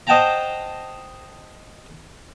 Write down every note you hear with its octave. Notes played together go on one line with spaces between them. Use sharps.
C5 D#5 F#5 G5 A5 A#5